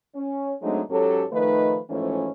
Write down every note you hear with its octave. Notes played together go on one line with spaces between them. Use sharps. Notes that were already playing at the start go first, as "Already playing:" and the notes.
C#4
F#3 G#3 A3 C4 D4 D#4
G#2 F#3 C#4 G4 A4
D#3 F3 A3 D#4 B4
G#2 E3 F3 A3 C#4